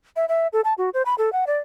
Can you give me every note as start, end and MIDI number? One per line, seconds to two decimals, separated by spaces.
0.16 0.25 76
0.29 0.47 76
0.53 0.61 69
0.64 0.74 81
0.78 0.90 66
0.94 1.02 72
1.06 1.15 83
1.18 1.32 69
1.33 1.45 78
1.47 1.58 74